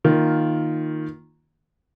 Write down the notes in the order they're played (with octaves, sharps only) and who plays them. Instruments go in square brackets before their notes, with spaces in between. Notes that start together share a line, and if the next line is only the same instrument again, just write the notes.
[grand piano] D#3 A#3 F4